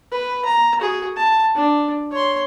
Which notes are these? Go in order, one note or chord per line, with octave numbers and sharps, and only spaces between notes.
B4
A#5
F#4 G#4
A5
D4
C#5 C6